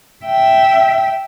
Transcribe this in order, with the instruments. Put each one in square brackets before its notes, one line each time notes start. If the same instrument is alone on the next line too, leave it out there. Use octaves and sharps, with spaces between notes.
[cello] E5 G5